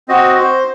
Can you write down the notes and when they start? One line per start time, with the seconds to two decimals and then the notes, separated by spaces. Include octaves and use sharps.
0.08 C4 F#4 D#5
0.38 C5